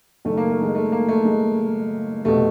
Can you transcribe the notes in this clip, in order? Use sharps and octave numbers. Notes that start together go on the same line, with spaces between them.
F#1 F#2 D#3 A3
A#3
A3
G#3
A3
A#3
A3
G#3
F1 B2 A3